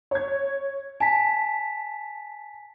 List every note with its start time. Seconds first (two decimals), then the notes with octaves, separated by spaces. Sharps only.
0.11 C#5 G#6
1.00 G#5 A5 B6